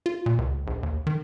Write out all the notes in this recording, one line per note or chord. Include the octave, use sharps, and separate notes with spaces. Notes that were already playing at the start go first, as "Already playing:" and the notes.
F4
A#2
C#2
A#1
D#2
D#3